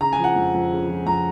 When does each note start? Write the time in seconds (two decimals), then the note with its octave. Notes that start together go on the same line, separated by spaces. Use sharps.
0.01 C#3 A#5
0.13 G#5
0.19 F3
0.24 F#5
0.36 F2
0.54 F2
0.72 C#3
0.88 F3
1.06 F2 A#5